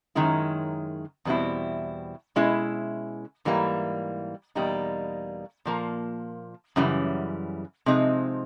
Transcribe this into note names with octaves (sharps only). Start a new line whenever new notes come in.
F#2 D#3 G#3 C#4 E4
E2 B2 G3 C4 E4
B2 G#3 C#4 E4
G#2 E3 G3 A#3
E2 B2 G3 A#3 D#4
A#2 F3 A#3
F#2 C#3 E3 G3
C3 F3 G#3 C4 D#4